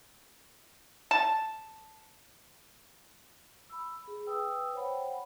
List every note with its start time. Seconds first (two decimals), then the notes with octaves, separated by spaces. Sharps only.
1.11 A5
3.70 B5 E6
4.08 G#4
4.27 B4 G5 D#6 E6
4.75 C5 C#5 F#5 G5 B5